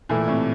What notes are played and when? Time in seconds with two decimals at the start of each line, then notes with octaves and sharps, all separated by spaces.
0.09 A#2 E3 A3 E4
0.28 A2 C3